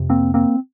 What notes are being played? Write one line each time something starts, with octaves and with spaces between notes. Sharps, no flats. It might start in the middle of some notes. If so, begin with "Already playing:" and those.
Already playing: F2 C3
A#3 C4
A#3 C4